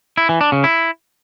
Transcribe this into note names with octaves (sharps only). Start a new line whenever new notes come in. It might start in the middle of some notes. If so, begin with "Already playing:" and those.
E4
E3
D4
C#3
E4